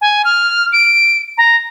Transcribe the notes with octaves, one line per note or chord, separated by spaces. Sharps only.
G#5
F6
D7
A#5